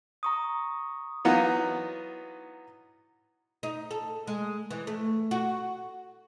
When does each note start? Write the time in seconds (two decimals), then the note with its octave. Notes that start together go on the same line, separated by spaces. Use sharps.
0.23 A#5 C#6 D#6
1.25 E3 F#3 B3 D#4 F4 F#4
3.63 D#4
3.91 A4
4.27 G#3
4.71 E3
4.87 A3
5.31 F#4